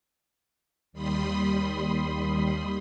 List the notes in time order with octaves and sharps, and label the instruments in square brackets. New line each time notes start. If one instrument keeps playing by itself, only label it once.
[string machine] D#2 G3 B5 C6 D#6